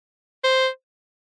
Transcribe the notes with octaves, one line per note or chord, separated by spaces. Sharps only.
C5